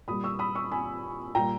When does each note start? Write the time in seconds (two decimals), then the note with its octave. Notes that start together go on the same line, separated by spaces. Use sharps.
0.08 A#2 G3 B5 D#6
0.24 C#6 E6
0.39 B5 D#6
0.55 C#6 E6
0.72 G#5 B5
1.35 A#2 G3 G5 A#5